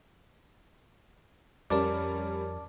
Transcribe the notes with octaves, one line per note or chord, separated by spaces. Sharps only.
F2 G3 C#4 A#4 D5 A5 D6